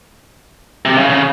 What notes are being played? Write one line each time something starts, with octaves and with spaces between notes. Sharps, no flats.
C3
C#3
C#3